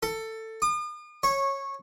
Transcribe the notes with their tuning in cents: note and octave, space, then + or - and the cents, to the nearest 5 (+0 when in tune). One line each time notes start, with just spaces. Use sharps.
A4 +15
D#6 -45
C#5 -15